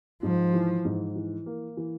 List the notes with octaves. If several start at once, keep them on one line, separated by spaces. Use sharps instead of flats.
G#2 F3
E3
G#2
E3
A#3
E3